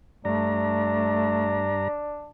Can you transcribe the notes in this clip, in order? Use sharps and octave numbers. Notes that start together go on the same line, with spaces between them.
G2 A3 D4 A#5